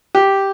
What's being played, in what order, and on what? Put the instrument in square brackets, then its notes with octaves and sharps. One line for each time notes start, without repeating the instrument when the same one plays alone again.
[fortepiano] G4